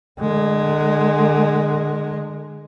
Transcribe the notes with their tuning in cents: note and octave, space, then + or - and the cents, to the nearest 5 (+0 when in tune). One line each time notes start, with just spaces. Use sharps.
D3 +35 G#3 +0